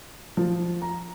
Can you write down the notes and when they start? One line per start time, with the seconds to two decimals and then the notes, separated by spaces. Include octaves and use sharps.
0.37 F3
0.82 A#5